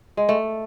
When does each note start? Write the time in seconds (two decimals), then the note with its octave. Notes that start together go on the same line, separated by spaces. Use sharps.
0.17 G#3
0.29 A3